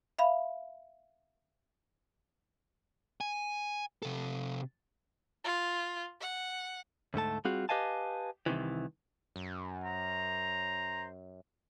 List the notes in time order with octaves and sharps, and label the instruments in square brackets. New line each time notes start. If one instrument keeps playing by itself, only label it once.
[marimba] E5 F5 B5
[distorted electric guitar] G#5
C3 A4
[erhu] F4
F#5
[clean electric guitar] D2 G#2 A3 A5
G3 C4 F4 F#4 G#4
G4 B4 D#5 F5 G#5 A5
C2 C3 D#3 E3
[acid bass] F#2
[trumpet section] C5 A#5